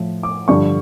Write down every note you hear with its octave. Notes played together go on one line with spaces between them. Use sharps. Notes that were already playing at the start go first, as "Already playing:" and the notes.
Already playing: A2 F3
D6
G2 D3 F3 C#6